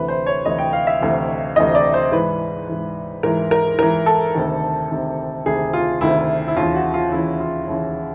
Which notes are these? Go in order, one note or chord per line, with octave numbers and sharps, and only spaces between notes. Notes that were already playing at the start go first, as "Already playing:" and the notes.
Already playing: D2 C3 E3 B4
C5
C#5
D2 C3 E3 D#5
G5
F5
E5
D2 C3 E3
D2 C3 E3 D#5
D5
C5
G#2 E3 B4
G#2 E3
G#2 E3 A#4
A#4
G#2 E3 A#4
A4
D2 C3 D#3
D2 C3 D#3
D2 C3 D#3 G#4
F4
D2 C3 D#3 E4
E4
D#2 C#3 E3 F4
F#4
F4
D#2 C#3 E3 E4
F4
D#2 C#3 E3